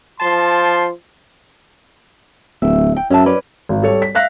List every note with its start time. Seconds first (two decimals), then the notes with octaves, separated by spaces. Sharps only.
0.21 F3 A5 C6
2.62 D1 E5
2.96 G5
3.10 F#2 C#4 E5 A5
3.26 C#4 B4 D5
3.69 G#1
3.82 G3 A4 C#5
4.02 B6
4.15 E5 F5 F#6 A#6